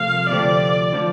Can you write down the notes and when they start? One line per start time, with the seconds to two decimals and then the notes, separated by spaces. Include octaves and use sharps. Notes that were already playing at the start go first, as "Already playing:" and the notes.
Already playing: C2 C3 F3 A3 F5
0.30 D2 C3 F3 A3 C4 D5
0.93 D3 F3 D4